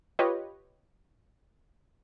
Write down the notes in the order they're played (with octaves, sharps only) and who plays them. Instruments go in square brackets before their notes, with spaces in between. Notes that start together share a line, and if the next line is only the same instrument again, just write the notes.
[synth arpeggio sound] F4 G4 B4 C#5 D#5